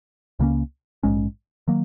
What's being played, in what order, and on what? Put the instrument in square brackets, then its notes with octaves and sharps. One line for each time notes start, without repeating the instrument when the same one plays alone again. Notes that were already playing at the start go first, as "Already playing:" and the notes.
[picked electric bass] C#2 C#3 A#3 C#4
A#1 G#2 G#3 C#4
D#3 F#3 A#3